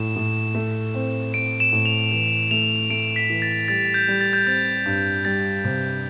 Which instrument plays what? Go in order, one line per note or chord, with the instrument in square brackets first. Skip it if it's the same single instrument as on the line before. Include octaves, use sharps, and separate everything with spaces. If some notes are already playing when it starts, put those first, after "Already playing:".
Already playing: [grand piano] A2 [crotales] E7
[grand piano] A2
A3
C4
[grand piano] C4 [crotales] D7
[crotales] E7
[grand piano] A2
[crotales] F7
[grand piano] E3
[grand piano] A3 [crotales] F7
[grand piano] A3 [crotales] D7
[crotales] B6
[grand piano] E3
[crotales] A6
[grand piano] G3 [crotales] A6
[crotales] G6
[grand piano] G3
[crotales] A6
G6
[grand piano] C4 [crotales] A6
[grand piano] G2
[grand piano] G3 [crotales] A6
[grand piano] C3